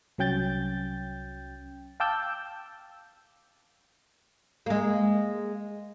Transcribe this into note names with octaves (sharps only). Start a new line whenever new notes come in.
C2 F#3 C#4 G5 G6 A6
F5 G5 A5 D6 E6 G6
G#3 A#3